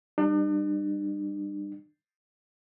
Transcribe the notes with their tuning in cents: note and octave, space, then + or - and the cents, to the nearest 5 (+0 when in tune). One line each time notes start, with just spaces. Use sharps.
G3 +5 D4 +45